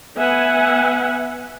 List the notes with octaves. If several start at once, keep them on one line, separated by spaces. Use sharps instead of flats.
B3 B4 E5 F#5 G#5